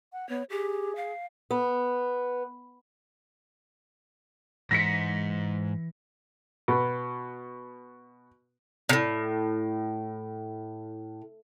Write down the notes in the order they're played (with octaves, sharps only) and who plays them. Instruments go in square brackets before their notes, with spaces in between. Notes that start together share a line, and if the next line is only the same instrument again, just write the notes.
[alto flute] F#5
[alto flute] B3 [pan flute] C#5
[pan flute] G4 [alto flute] G#4
[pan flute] F5
[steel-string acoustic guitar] B3
[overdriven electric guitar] G#2 [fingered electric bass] E3 [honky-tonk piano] A#6 B6 C#7
[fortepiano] B2 B3
[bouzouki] A2 C3